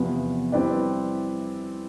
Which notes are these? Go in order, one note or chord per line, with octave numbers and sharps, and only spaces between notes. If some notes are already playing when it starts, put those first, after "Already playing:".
Already playing: E2 C3 F3 B3
G3 C4 E4 B4 D5